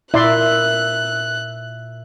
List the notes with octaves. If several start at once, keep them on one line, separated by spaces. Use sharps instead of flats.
A#2 E4 D5 E5 C6 F#6